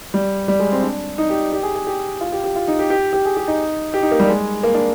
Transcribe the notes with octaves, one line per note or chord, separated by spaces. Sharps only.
G3
G3
G#3
C4
D4
D#4
G4
G4
G#4
G#4
G4
F4
G4
G4
F4
D#4
G4
G4
G4
G#4
G4
D#4
G4
D#4
A#3
G3
G#3
A#3
D4